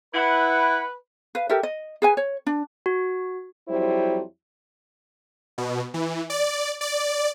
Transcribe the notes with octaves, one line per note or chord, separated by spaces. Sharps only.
E4 B4 F#5
B4 F5
G4 A4 A#4 E5
D#5
G#4 B4 G#5
C#5
D4
F#4
F2 F#3 G3 E4 C5
B2
E3
D5
D5